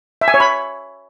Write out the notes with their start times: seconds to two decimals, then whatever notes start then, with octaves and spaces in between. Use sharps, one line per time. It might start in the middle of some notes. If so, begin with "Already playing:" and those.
0.21 E5
0.28 G#5
0.34 C#5
0.40 B5